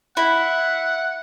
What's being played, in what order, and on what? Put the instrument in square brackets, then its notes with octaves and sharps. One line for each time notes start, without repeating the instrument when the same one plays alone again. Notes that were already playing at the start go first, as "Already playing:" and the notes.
[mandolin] E4 [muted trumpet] F#5